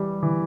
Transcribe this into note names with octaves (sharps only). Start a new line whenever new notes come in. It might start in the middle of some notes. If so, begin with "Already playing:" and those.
Already playing: E3 G3
E3